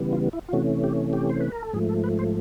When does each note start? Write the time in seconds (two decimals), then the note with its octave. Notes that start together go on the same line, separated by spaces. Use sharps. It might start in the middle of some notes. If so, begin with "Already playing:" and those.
Already playing: C#3 E3 G3 B3
0.13 F4
0.33 E4
0.49 F4
0.53 C3 E3 A3 C#4 F#4
0.84 G4
1.13 G4
1.29 C5
1.40 B4
1.52 A#4
1.62 A4
1.73 G#2 F3 A3 G#4
1.89 A4
2.04 B4
2.19 C5